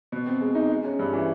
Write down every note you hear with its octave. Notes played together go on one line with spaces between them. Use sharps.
B2
C4
G#3
D#4
G#3
C#4
G2
E3